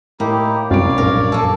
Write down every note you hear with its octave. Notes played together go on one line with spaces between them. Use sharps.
A2 A#3 D#4 E4 G4
F1 C2 F#2 C#5 D5 F5 D7
A#1 G2 A#4
A#3 A4